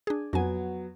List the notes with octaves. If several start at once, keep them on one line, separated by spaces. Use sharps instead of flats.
D4 G#4
F2 F#3 B3 G#5